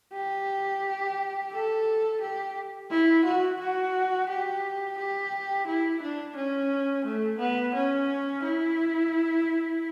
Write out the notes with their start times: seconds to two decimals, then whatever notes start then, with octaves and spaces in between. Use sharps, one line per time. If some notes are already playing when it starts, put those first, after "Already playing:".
0.14 G4
1.52 A4
2.21 G4
2.90 E4
3.25 F#4
3.59 F#4
4.29 G4
4.97 G4
5.66 E4
6.02 D4
6.35 C#4
7.05 A3
7.39 B3
7.74 C#4
8.43 E4